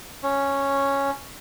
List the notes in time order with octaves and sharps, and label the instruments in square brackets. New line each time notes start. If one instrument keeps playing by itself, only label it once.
[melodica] C#4